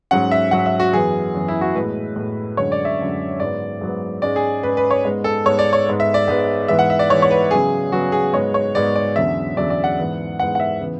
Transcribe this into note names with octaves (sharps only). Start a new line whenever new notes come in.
G#2 F#3 C#4 F#5
E5
G#2 F#3 C#4 F#5
E5
F#4
F#2 E3 B3 G#4
F#2 E3 B3
E4
F#4
A2 G#3 B3 B4
A2 G#3 B3
F#2 D3 G#3 C#4 C#5
D5
E5
F#2 D3 G#3 C#4
G#2 F#3 B3 D5
G#2 F#3 B3
G#2 G#3 C#4 D5
G#4
G#2 G#3 C#4 B4
B4
C#5
G#2 G#3 B3
A4
G#2 G#3 B3 C#5
D5
C#5
G#2 G#3 B3
E5
D5
G#2 G#3 B3
G#2 E3 B3 E5
F#5
E5
D5
G#2 E3 B3 C#5
C#5
B4
C#3 F#3 B3 G#4
C#3 F#3 B3 F#4
G#4
G#2 G#3 B3 C#5
C#5
G#2 G#3 B3 D5
D5
E2 D3 F#3 C#4 E5
E2 D3 F#3 C#4 D5
D5
F#5
G#2 E3 B3
G#2 E3 B3 F#5
F#5
E5
C#3 E3 B3